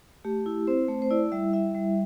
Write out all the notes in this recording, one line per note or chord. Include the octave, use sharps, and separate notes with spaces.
A3 G4
E4
C4 C5
A3
C5
E4 D5
G3 E5
E4 E5
G3